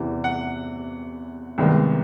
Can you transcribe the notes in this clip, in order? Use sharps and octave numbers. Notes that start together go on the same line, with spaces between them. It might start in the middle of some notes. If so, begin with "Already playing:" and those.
Already playing: E2 C3 E3
F#5
C2 C3 D#3 G#3 B3